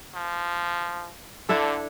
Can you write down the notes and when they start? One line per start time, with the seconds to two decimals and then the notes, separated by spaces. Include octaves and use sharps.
0.15 F3
1.49 D3 D4 E4 A4